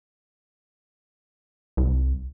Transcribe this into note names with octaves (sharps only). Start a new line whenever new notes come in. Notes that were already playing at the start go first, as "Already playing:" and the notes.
C2